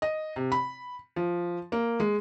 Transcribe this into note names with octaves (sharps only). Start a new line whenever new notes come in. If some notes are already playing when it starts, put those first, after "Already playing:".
D#5
C3
B5
F3
A#3
G#3